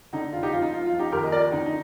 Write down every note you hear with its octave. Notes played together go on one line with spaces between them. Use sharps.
D3 D#4
F1 F4
D#4 G4
F3 F4
D#4
F3 F4
F4
F3
D#4 G4
D#2 G4 A#4
D#5
F3 A#4 D5
D3 D#4
D#4